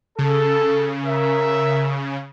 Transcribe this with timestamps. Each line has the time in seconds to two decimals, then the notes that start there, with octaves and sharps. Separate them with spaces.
0.19 C#3 A4
1.06 A#4 E5